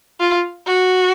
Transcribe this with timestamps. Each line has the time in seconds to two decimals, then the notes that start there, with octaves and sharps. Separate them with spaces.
0.20 F4
0.66 F#4